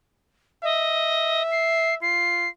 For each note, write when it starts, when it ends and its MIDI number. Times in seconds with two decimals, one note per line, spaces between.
0.64 1.43 75
0.64 1.97 76
1.52 1.95 96
2.02 2.49 65
2.02 2.48 96